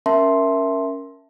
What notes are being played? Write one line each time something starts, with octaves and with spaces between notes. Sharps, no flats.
C#4 A#4 E5 A5 C6